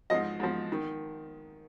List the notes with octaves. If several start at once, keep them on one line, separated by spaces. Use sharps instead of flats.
G#2 F3 D#5
G#2 F3
D#3